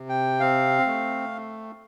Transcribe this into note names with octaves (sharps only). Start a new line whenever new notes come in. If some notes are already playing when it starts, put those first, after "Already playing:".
Already playing: C3
G5
C4 F5
A3